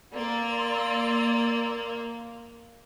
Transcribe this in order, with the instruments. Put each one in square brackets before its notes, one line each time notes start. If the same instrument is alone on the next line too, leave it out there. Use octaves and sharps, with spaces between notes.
[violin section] A#3 [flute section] D5 C6 E6